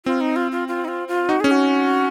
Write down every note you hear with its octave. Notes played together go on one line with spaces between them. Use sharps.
C4 F4
D#4
F4
F4
F4
D#4
F4
F4
D#4 F#4
C#4 G#4
F#4